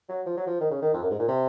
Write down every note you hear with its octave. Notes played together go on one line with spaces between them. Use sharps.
F#3
F3
F#3
F3
D#3
C#3
D#3
F2
F#2
G#2
A#2
C3